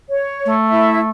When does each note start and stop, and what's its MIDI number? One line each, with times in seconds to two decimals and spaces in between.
0.09 0.53 73
0.45 1.09 57
0.69 0.98 64
0.69 0.98 76